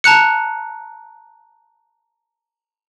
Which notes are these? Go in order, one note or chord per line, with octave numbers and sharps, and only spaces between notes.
A5 A#5 F#6 C#7